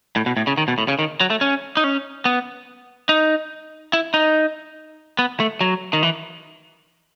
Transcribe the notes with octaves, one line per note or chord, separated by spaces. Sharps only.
A2
B2
A2
C#3
D#3
B2
A2
C#3
D#3
F#3
A3
C#4
D#4
C#4
B3
D#4
E4
D#4
B3
A3
F#3
D#3
E3